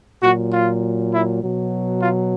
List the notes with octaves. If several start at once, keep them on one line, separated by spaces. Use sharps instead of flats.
A#2 F#3 F#4
F4
E4
B2 F#3
F4